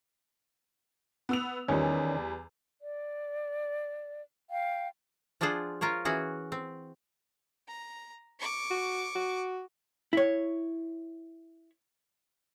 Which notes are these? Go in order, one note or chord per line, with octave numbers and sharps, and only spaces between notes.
B3 E6 F7
E2 D#3 G3 C#4
D5
F5 G5
F3 D4 F4 G#4 C5 F#5
F4 A#4 C5 C#5
E3 C#4 F#4 G#4
C4
A#5
C#6 D6
F#4
F#4
E4 C#5